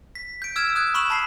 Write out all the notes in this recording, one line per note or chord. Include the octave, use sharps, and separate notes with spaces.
B6
G6 D7
E6 F6 G#6 E7
D#6 F#6 G#6
B5 C#6 E7 F#7
A5 B5 B6 C7